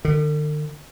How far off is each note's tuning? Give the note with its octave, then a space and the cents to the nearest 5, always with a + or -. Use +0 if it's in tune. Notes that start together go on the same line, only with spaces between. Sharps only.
D3 +45